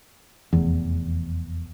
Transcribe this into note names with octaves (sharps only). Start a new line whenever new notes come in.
F1 E2